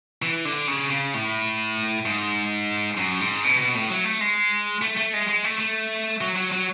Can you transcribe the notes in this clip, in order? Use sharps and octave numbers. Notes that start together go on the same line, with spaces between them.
E3
D3
C#3
C#3
A2
G#2
F#2
G#2
B2
B2
A2
F#3
A3
G#3
A3
A3
G#3
G#3
A3
A3
F#3
F#3
F#3